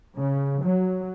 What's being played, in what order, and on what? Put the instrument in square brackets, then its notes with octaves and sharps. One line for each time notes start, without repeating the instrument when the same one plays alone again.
[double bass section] C#3
F#3